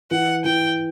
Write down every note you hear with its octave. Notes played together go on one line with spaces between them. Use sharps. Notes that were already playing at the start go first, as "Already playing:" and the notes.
E3 F#5
E3 G5